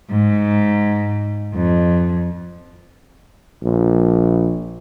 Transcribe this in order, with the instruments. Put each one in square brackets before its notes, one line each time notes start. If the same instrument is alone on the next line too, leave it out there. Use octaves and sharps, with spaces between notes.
[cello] G#2
F2
[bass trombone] A#1